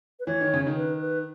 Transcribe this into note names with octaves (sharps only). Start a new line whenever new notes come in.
B4
E3 C#5
D#3
C#3
D#3
B4
B4